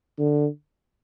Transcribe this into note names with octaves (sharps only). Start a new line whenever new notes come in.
D3